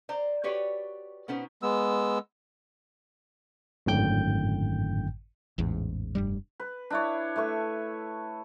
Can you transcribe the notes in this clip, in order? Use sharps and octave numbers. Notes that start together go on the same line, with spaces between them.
C5 D5 A#5
F#4 G4 B4 C#5 D5
B2 B3 C#4 D#4 C5
G#3 B3 E6
G#1 F#2 A2 D3 G5 G6
A1 E2 G#2
F1 G2 G3
B4
D4 E4 C#5
A3 B4 E5 C#6